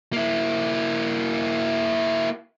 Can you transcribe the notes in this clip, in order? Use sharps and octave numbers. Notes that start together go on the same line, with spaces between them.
A#3 E4